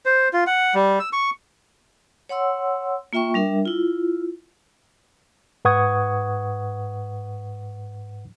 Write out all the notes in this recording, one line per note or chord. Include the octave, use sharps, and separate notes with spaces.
C5
F4
F#5
G3
E6
C#6
C#5 F#5 C6 E6
A#3 F4 E5 G5 C#6
G3 D4 A#4 E5
E4 F4
G#2 B4 F#5 C#6 D#6 G#6